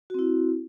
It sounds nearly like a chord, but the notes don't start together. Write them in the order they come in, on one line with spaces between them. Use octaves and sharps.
F#4 C4 E4